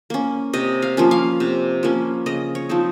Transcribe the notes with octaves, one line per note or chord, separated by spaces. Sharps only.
A#3 C#4
C3 D#5
F5
F3 A#3 C#4
F5
C3
F3 A#3 C#4
C#3 D#5
C#5
F3 C4 D#4